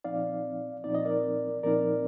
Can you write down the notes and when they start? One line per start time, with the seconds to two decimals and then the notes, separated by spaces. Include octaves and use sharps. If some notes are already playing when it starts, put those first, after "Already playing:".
0.04 A#2 F3 C4 D#4 D5 F5
0.84 A#2 F3 C4 D#4 D5
0.95 D#5
1.05 A#4 D5
1.63 A#2 F3 C4 D#4 A#4 D5